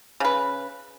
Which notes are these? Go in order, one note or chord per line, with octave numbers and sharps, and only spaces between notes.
C#3 B4